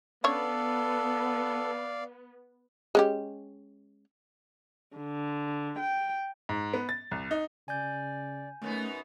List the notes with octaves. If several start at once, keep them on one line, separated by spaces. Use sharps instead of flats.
B3 C#4 D4 A4 C#5 D5 F5
G#3 C#4 G4
D3
G5
G#2
B3
A6
C2
D#4
C#3 D5 G#5 G6
F#2 A3 B3 C#4 D#4